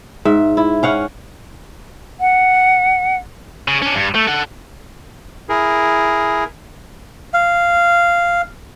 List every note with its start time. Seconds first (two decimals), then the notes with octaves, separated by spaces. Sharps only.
0.25 G#2 E5
0.57 E4
0.83 C#4 F5 F#5
2.20 F#5
3.68 C#3
3.82 C#4 D4
3.95 G2
4.15 A3
4.28 A4 F#5
5.49 E4 G#4 A#4
7.34 F5